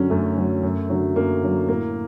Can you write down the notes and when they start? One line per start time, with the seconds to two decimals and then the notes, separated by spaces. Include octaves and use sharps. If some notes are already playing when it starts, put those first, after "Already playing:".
Already playing: F#2 D3 F#3 C#4
0.10 F#2 A3
0.37 D3 F#3
0.63 F#2
0.89 D3 F#3
1.16 F#2 A#3
1.42 D3 F#3
1.68 A2 A#3